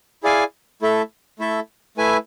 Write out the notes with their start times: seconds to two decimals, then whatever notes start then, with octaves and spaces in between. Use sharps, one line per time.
0.23 E4 G#4 D5 F5 G#5
0.82 A3 E4 A4 E5
1.39 A3 E4 A4 E5
1.97 A3 E4 B4 E5 G#5